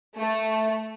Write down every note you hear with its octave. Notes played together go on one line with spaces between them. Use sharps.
A3